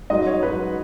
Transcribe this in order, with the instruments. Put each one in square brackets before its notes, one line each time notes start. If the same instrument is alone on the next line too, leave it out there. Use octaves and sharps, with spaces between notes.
[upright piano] G#2 F#3 D#5
C#5
G#2 F#3 B4